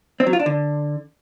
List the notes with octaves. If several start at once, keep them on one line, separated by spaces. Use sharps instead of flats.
C4
F#3
F4
D4
D3